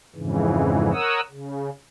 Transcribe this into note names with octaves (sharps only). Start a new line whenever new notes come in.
F2 G#2 C#3 E3
A#4 C#5 F#5 D#6 E6
C#3